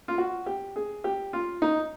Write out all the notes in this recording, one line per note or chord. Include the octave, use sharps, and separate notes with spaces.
F4
F#4
G4
G#4
G4
F4
D#4